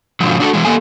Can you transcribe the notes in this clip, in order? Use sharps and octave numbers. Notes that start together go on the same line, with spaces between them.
G#2 B2 D3 F3 F#3
D4 F#4 A4
E3 G#3
A#3 G4 A4 G#5